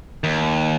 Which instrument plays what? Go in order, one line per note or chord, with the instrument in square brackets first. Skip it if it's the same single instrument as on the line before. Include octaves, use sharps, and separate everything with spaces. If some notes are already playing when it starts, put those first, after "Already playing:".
[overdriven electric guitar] D#2